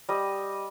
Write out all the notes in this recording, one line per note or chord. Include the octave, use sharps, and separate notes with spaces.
G3 D#5